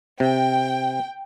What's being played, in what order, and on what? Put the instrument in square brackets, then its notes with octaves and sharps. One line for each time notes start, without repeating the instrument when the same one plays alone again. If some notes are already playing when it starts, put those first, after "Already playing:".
[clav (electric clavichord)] C3 [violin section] G5